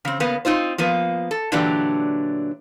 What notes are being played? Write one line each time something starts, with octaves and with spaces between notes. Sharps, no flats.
C#3 C4
C#3 A#3 B3
C4 D#4 F4 C5
F3 A#3 B3
A4
A#2 D3 E3 F#3 D4 G4